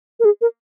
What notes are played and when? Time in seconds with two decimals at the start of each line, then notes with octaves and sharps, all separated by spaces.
0.20 A#4
0.25 G#4
0.41 A#4